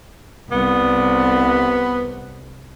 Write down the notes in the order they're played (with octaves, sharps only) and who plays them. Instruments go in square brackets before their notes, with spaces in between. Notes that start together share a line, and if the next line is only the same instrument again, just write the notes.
[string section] C2 [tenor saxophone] B3